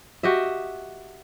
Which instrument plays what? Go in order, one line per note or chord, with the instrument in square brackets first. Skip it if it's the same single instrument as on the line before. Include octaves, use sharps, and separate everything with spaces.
[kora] F#4 G4 D#5 E5